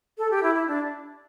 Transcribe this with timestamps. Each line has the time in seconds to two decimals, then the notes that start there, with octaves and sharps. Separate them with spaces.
0.18 A4
0.31 G4
0.43 E4
0.55 E4
0.67 D4